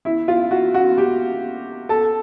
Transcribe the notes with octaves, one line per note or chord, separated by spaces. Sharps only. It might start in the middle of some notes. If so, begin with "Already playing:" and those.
E4
F4
F#4
F#4
G4
A4